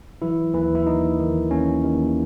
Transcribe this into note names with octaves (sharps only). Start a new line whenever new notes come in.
E3 F#3 E4
D#2 E3 E4
E4
D#2 D#4
D#3
D#2 C#4
D#2